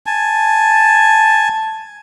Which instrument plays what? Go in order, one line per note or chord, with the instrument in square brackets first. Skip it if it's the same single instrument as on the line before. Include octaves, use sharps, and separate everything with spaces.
[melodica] G#5 A5